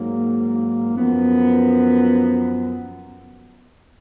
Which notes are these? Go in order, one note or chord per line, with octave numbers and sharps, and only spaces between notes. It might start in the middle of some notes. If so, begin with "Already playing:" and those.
Already playing: G#2 F#3 A#3
F#2 F3 B3